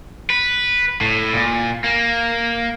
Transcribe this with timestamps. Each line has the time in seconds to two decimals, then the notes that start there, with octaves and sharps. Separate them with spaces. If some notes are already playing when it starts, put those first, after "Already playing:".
0.30 B4
1.01 A2
1.34 A#2
1.84 A#3